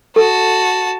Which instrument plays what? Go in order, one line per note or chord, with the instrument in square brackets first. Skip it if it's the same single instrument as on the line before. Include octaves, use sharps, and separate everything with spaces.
[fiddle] F#4 A5 [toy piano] A4